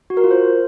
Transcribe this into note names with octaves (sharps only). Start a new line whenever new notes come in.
F#4
A#4
F4
C5